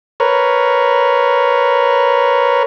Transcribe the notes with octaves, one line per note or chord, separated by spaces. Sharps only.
A#4 B4 C#5